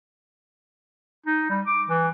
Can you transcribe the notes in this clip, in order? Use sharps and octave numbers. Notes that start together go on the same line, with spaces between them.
D#4
G3
D6
E3